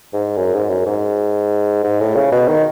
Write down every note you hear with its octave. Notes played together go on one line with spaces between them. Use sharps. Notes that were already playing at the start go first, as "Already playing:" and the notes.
G#2
F#2
G#2
F#2
G#2
G#2
A2
C#3
B2
D#3